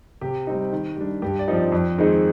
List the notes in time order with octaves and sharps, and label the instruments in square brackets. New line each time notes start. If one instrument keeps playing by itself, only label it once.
[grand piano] C3 G4
G3 C4 D#4
D#3
G3 D4
G2 G4
D5
F3 C4 D#4
D5
F2
D#3 G#3 C4 D#4